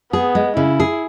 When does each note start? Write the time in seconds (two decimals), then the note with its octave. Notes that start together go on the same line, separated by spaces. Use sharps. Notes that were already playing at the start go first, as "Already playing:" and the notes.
0.13 B3 G#4
0.35 G#3
0.57 C#3 E4
0.80 G#4